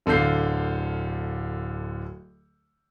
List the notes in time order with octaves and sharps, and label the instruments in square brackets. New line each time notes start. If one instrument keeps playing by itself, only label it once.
[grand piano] D1 D3 A4 F5 G6 C7